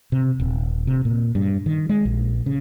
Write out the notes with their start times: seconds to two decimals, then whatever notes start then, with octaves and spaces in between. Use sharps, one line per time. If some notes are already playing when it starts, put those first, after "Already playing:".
0.12 C3
0.40 D#1
0.87 C3
1.05 A#2
1.35 G2
1.66 D#3
1.89 G#3
2.05 A#1
2.46 C#3